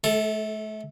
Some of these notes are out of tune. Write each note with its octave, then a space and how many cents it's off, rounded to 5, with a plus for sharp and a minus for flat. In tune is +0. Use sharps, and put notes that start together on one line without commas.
A3 -35 A4 +0